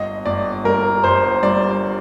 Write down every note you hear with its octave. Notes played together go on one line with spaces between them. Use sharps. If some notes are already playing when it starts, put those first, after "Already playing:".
Already playing: G1 D#5
G1 D5
G2 A#4
G1 C5
G2 D5